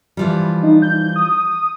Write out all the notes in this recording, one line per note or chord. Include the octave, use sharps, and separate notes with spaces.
E3 F3 G3
D#4
G6
D#6